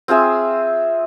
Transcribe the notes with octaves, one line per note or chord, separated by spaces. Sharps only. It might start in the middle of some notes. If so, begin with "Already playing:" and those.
C4 F4 G#4 E5